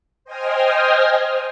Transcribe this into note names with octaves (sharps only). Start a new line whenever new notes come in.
C5 D#5 G5 G#5 D#6 F6